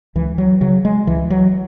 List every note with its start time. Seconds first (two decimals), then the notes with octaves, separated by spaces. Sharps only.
0.15 C#2 E3
0.38 F#3
0.61 C#3 F#3
0.85 G#3
1.07 C#2 E3
1.30 F#3